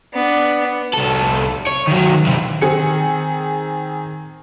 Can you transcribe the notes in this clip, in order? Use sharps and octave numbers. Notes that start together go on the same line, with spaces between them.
B3 D4
C2 A4
C#5
D#3 F#3
C3 E3
D#3 C4 G#4 C#7